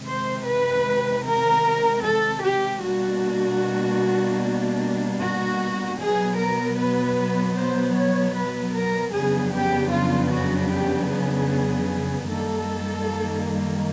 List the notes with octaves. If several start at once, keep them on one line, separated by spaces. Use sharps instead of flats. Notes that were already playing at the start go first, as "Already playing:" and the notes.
Already playing: C3 D#3 G#3 C4
C5
B4
A#4
A4
G4
B2 G3 A#3 D4 F#4
F#4
B2 F#3 B3 G#4
A#4
B4
C5
C#5
B4
A#4
F2 C#3 F#3 B3 D4 G#4
G4
F4
F#4
G4
G#4
F#2 D#3 G3 A#3 A4